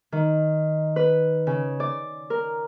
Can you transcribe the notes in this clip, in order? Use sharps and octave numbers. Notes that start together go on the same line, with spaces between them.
D#3
B4
C#3
D5
A#4